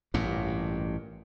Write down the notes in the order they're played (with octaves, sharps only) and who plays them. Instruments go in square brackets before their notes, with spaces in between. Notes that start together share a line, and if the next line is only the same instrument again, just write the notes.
[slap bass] A1 G2 A#2